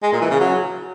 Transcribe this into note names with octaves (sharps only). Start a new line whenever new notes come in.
G#3
A#2
E3
C#3
F#3